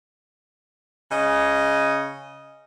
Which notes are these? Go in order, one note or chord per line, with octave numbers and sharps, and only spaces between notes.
C#3 D#5